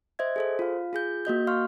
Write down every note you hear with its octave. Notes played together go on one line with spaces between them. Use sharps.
C5 D#5 E5 G#6
G#4 A4 C5
F4 F5
F4 G#4 G6
A#3 F#4 D#5 G6
F5 C6 C#6 F6